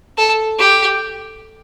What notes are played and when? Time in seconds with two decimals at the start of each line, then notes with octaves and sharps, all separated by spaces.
0.17 A4
0.59 G4